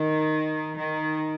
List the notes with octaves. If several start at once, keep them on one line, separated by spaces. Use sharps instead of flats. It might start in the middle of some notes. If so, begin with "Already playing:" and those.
Already playing: D#3
D#3